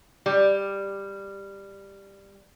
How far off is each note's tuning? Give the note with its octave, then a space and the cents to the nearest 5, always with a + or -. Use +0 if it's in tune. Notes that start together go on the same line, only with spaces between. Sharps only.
G3 +10